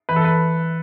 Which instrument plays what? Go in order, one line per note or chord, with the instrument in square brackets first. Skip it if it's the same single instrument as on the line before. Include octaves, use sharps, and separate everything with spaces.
[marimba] E3 [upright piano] B4
[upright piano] A4
B4